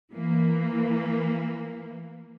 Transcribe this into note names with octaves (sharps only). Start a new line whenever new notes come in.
E3 A#3